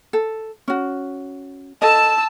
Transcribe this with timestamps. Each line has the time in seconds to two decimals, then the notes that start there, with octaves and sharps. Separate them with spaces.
0.13 A4
0.68 C#4 F#4
1.82 A4 D#5 A5 E6